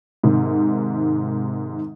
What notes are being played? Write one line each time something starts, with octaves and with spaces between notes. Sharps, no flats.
G#2 C3 D#3